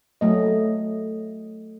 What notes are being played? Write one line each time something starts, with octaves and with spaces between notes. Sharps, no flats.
F#3 A3 D#5